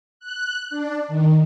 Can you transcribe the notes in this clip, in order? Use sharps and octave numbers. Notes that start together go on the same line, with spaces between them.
F#6
D4
D#3